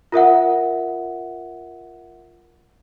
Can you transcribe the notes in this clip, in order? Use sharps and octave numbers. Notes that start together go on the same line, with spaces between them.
F4 A#4 E5 F#5